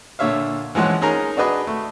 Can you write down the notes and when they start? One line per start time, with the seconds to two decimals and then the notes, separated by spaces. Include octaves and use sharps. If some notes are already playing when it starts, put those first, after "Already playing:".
0.19 A#2 D3 C#5 E5 F5
0.75 E3 F3 G#3 C#4 F#5
1.01 C#4 D#4 G#4 A#4 G#5 A#5
1.37 D4 F#4 G#4 B4 D#5
1.67 A3